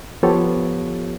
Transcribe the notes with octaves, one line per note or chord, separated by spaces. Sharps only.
F3 B3 F4 G4 A4 C#5